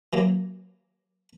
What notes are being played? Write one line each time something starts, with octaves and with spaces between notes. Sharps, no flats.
E3 F#3 A#3